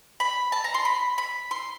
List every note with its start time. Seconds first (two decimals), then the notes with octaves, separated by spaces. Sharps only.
0.20 B5
0.52 A5
0.64 A#5
0.74 C6
0.85 B5
1.18 B5
1.51 C6